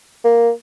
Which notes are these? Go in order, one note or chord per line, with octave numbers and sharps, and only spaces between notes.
A#3